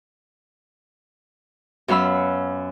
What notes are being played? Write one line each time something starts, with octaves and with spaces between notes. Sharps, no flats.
F#2 B3 F5 B5 E6